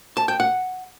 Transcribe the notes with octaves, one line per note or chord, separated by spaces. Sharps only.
A5
G5
F#5